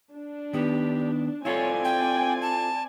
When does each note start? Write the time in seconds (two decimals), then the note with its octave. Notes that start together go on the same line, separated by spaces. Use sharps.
0.13 D4
0.53 D#3 B3 G4
1.45 C4 E4 F4 A4 C#5 D5 G#5
1.85 G5
2.42 A5